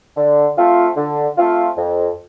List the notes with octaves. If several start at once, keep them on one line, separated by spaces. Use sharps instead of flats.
D3
A3 C4 F4
D3
A3 C4 F4
F2